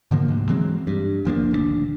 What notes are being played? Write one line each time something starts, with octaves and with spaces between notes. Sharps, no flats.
G#2 D3 F3 A#3
D2 G#2 C3
E3 F#3 G#3 C4
G2
F#1 F3 A#3 D4
D#1 D2 A3 D4